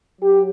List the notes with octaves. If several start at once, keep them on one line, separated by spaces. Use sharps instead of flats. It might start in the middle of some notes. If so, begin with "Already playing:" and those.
F#3 G4